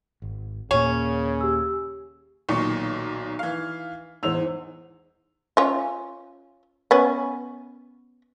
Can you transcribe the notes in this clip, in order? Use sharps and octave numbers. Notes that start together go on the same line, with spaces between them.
G#1
D#2 A#2 C#3 A#3 C#4
G4 E6
B1 A#2 D#3 C#6
E3 F5
E2 G#2 C5 E6 F7
C#4 F4
B3 C#4